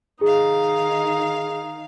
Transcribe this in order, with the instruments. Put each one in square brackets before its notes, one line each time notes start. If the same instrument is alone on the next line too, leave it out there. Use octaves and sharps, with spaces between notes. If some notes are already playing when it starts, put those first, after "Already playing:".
[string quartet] D#3 F5 [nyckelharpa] D#4 [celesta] G#4